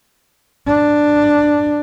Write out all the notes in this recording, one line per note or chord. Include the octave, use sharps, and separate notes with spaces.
D4